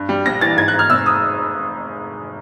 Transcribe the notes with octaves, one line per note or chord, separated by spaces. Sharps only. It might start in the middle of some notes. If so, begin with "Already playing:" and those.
Already playing: G2
G3
A#1 A#6
E3 A6
G#2 G#6
F#6
G#2
F6
F1 E6
D#6